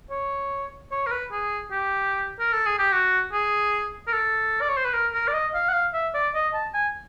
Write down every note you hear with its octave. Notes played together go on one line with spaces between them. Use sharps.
C#5
C#5
A#4
B4
G#4
G4
A#4
A4
G#4
G4
F#4
G#4
A#4
A4
D5
C#5
C5
B4
A#4
A#4
D5
D#5
F5
F#5
F5
E5
D5
D#5
A5
G#5